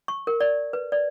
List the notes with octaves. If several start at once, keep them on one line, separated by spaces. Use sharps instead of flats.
C#6
A#4
D5
B4
D5